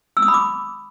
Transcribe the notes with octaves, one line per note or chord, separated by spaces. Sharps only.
E6
D#6
B5
D6